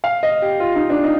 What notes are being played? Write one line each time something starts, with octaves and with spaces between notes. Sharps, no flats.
F5
D#5
G4
F4
D#4
D4
D#4